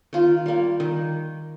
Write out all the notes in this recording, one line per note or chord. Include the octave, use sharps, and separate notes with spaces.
D#3 F4
G3 A#3
D#3